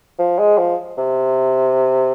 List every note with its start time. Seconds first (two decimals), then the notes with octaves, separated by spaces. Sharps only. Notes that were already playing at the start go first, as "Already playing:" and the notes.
0.19 F3
0.39 G#3
0.58 F3
0.97 C3